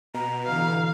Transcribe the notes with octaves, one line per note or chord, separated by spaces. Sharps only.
B2 A#5
D3 E3 F5